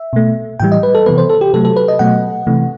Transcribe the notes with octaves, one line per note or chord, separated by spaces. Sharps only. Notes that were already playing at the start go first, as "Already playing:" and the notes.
Already playing: E5
B2 A3
A2 E3 G3 G5
D#5
B4
A4
C3 E3 B3 B4
C5
A4
G4
C3 F#3 A3 A4
A4
B4
D#5
B2 F#3 A3 F#5
C3 E3 A3